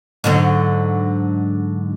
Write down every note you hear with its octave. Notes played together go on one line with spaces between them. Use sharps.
G#2 D3 F#3